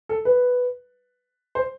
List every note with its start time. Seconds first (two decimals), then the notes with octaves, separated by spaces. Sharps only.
0.09 A4
0.25 B4
1.55 C5